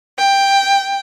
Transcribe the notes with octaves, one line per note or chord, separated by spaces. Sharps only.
G5